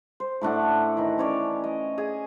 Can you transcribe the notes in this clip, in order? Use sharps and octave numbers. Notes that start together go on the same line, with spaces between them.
C5
A2 A3 D4 F#5
D#3 E3
C#4 C#5 D5
D#5
G#4 G#5